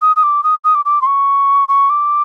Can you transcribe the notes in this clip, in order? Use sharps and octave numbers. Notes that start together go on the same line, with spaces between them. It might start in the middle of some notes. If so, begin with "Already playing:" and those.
D#6
D#6
D6
D#6
D#6
D6
D6
C6
C#6
C#6
D6